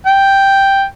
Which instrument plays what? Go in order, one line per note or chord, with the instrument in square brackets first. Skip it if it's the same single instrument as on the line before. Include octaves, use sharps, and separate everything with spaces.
[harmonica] G5